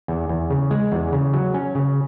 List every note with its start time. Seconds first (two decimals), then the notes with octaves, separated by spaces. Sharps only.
0.08 E2
0.29 E2
0.50 C#3
0.71 G#3
0.92 E2
1.12 C#3
1.33 F#3
1.54 C#4
1.75 C#3